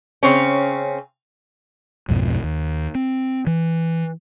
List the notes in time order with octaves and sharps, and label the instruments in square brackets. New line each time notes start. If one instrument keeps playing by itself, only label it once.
[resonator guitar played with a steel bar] C#3 C4 C#4
[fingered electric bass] B1 F2 G#2 B2
D#2
C4
E3